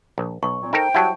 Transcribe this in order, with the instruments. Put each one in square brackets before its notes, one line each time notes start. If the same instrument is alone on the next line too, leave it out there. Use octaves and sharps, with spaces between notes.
[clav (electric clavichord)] A#1
[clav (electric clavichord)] B1 [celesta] C#6
[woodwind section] A#2 F#3 C4
[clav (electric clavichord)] D#4 A4 A#4 [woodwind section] C5 G5
[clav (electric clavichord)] F#3 G3 E4 [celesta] F#5 A5 C#6